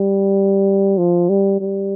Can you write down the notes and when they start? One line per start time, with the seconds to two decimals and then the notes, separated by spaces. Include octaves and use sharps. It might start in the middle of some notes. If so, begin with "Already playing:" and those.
Already playing: G3
0.98 F3
1.29 G3
1.61 G3